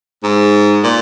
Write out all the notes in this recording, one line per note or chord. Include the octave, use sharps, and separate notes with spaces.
G#2
A#2